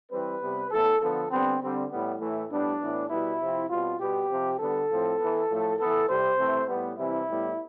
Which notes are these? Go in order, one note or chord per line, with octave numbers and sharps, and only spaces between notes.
E3 G3 C4 B4
C3 G3 B3
A2 E3 B3 A4
D3 F3 B3 A4
D3 G3 B3 C4
D3 G3 C4
A2 G3 B3
A2 E3 A3
A2 G3 B3 D4
A2 E3 B3
B2 G3 B3 E4
C3 F3 C4
B2 G3 C4 F4
B2 G3 B3 G4
C3 F3 C4
D3 G3 B3 A4
A2 F3 C4
E3 B3
A2 F3 A3
E3 B3 A4
C3 G3 C4 C5
C3 E3 A3 C4
A2 G3 B3
C3 E3 G3 C4 E4
A2 G3 B3